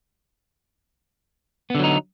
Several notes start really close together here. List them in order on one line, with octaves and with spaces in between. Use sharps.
B3 D3 F#3 D#4